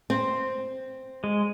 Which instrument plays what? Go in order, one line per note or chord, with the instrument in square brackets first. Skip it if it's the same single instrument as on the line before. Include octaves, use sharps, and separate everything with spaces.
[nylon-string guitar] C4
[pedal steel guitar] G#3